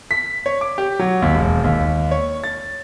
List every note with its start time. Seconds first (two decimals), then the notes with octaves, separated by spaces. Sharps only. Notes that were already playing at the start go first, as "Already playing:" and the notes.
0.11 B6
0.46 C#5
0.61 D6
0.78 G4
0.99 F#3
1.22 D#2
1.35 E1
1.64 D#2
2.11 C#5
2.44 A6